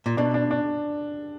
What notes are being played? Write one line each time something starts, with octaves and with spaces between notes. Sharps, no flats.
A#2
B2 D4
D4
D4